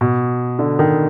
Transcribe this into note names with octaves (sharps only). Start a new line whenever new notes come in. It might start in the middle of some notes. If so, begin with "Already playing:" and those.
B2
D3
D#3